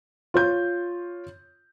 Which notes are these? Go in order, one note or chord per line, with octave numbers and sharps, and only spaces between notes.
F4 C#5 G6